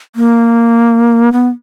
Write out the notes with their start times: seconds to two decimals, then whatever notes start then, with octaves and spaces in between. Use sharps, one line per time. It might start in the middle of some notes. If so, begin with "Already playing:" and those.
0.16 A#3
1.33 B3